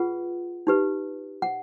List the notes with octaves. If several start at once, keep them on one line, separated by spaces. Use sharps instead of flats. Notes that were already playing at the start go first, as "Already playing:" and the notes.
Already playing: F4 G#4 B4 F#5
D#4 G4 B4
F#5